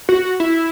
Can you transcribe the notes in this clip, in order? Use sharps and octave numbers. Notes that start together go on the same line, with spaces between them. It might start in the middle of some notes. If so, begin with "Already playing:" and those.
F#4
E4